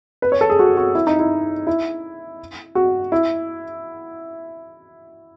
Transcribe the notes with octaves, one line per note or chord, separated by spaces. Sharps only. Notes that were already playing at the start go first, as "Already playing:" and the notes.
B4
C#5
A4
G#4
F#4
F#4
E4
D#4
E4
E4
F#4
E4